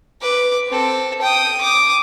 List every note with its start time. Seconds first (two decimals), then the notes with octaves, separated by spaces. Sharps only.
0.21 B4 D6
0.68 C4 A4
1.22 G5 D#6
1.61 D6 D#6